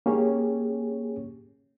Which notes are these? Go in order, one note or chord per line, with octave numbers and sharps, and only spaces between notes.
A#3 C#4 G4 G#4 C#5